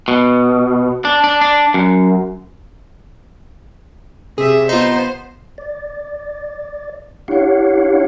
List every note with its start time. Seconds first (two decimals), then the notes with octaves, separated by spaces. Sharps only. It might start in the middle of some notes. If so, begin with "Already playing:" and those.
0.08 B2
1.05 D4
1.24 D4
1.41 D4
1.74 F#2
4.38 C3 G#4 E5
4.69 B3 D#4 F4 C5
5.58 D5
7.28 D4 E4 G4 C#5 F5 F#5